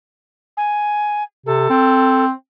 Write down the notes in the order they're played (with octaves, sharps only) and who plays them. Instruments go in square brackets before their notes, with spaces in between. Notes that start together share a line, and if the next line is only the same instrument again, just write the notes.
[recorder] G#5
[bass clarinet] C3 [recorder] A4
[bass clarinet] C4